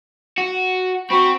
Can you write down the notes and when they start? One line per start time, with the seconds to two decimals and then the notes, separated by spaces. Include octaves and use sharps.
0.38 F#4
1.10 C4 F#4 B5 C#6